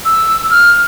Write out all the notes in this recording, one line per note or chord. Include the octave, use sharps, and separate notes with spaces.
E6
F6